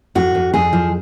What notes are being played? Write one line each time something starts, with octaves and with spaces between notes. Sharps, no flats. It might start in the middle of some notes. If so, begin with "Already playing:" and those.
F2 F#4
F2
F2 G#4
F3